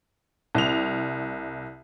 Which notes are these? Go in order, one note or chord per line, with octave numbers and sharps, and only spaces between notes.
C2 F7